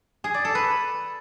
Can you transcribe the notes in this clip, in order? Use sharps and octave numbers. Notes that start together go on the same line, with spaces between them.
G#4
D5
A4
B4